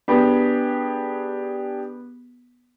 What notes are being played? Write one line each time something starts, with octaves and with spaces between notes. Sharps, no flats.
B3 D4 G4 G#4